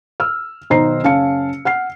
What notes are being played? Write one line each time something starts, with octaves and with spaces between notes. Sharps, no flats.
E6 F6
B1 D#3 C5 D#5 A#5 C7
F#1 C#4 F5 A5 C#7
F#5 F6 C7